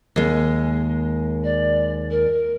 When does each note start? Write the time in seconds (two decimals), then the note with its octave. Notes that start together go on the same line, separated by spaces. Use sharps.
0.16 D#2 G#3
1.44 D5
2.10 A#4